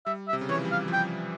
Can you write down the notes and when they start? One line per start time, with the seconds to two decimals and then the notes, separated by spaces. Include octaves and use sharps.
0.06 G3 E5
0.28 E5
0.33 C3
0.41 C#3
0.49 E3 C#5
0.56 F3
0.65 G3
0.71 F5
0.88 F3
0.93 G3 G5